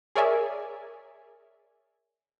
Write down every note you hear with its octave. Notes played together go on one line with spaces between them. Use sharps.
G#4 A#4 C#5 D5 E5 G#5